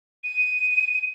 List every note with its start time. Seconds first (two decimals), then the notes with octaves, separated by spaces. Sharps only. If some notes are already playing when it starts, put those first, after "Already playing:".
0.24 D#7